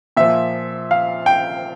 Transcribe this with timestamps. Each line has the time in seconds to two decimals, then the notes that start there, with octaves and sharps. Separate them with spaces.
0.17 A#2 F3 E5
0.91 F5
1.26 G5